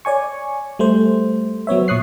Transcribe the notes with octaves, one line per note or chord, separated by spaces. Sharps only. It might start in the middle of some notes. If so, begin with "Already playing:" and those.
C#5 D5 G#5 C#6
G3 A3 C5
F#3 B3 C#5 E5
A#2 C#6 D#6 F#6 C7